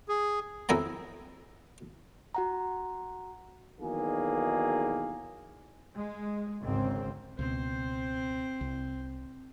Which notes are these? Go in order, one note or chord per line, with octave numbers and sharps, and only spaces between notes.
G#4
F2 E4 E5 G#5 A#5
F#4 F#5 A#5
B1 E2 D#3 A#3 F#4 G#4
G#3
G#1 D2 G#2 C#3 C4
C#2 B2 C4 C5
C2